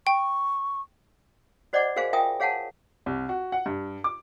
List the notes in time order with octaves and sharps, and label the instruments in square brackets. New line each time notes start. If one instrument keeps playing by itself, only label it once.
[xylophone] G5 [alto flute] C#6
[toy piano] F#4 C5 D5 D#5 F#5 D6
F#4 G#4 A#4 C5 F5 G#5
F4 A#4 E5 G5 G#5 D#6
G#4 C#5 F5 F#5 G#5 A5
[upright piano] C2
F#4
F#5
G2
D6